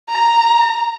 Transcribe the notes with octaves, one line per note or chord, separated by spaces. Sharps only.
A#5